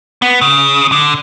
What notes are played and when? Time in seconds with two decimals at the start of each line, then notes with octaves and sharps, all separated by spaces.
0.22 B3
0.41 C#3
0.92 D3